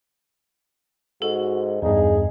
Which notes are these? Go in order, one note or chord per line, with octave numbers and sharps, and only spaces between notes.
G#2 F#4 A4
E2 G2 D#4 G#4